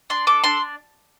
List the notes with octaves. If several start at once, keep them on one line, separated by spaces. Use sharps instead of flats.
D4 C6
A4 D6
D4 C6